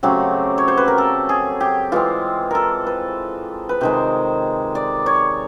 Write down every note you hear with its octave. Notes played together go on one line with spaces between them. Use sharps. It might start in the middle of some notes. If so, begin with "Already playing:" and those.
C#3 F#3 A3 C4 G4
C#5
C5
B4
A#4
A4
G#4
G4
E3 G#3 C4 F4
A4 A#4
B4
B4
C3 D#3 G#3 C5
D5
C#5